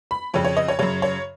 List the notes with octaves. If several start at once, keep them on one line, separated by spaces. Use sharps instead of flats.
B5
F2 C#3 C#5
C#5
D#5
C#5
F#2 C#3 C#5
C#5